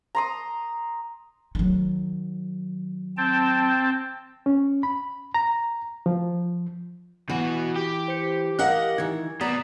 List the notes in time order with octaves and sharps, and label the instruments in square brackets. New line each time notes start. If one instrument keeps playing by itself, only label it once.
[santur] A#5 C6 D#6
[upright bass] D#3 F#3
[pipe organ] C4 G5 A5
[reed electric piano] C#4
B5
A#5
F3
[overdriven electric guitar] B2 F#4 [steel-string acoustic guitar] E3
[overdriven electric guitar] G4
[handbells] C5 C#7
[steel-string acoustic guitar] A#4 D#5 F#5 [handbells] F5 F#6
[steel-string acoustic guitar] D#3 E3 [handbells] G#6
[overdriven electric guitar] B2 [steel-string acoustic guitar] D5 A#5 [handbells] D#6 A6 B6